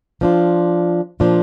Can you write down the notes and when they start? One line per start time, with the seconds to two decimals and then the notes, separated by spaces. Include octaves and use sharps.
0.21 F3 D4 F4
1.20 A#2 F3 D4 F4